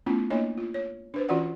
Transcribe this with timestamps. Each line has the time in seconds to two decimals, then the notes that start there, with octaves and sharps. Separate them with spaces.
0.06 A3 B3 C#4 E4 F4
0.30 A#3 D4 E4 C#5 D#5
0.57 F4
0.74 C#5
1.14 D4 B4 C5
1.29 E3 C#4 F4 F#4 D5 F#5